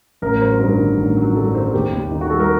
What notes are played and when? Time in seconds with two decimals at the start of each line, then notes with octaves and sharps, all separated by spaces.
0.22 A1 A#4
0.41 F#3 C5
0.60 G2 A#4
0.78 D#3
0.97 A1
1.17 F#3
1.35 G2 A4
1.55 D#3 C5
1.64 A#4
1.73 D#2 G4
1.93 D#2
2.11 D#3 D#4
2.21 F#4
2.30 G3 A4
2.39 A#4